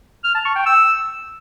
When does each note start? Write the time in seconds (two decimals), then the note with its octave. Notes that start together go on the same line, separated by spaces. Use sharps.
0.24 F6
0.35 A5
0.45 C#6
0.56 G5
0.66 E6